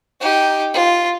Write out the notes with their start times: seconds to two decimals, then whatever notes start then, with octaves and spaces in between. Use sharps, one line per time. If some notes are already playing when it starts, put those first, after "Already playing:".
0.20 D#4 G4
0.74 F4